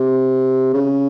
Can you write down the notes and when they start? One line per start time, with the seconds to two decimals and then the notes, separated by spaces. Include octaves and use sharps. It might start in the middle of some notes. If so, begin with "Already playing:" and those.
Already playing: C3
0.74 C#3